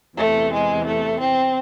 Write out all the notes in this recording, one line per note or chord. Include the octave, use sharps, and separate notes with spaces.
E2 C3 E3 A3
G#3
A3
C4